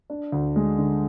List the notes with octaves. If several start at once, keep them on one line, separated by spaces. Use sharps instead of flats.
D4
D2
G#3
D3